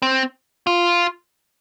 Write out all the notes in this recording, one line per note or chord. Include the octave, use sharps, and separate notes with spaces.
C4
F4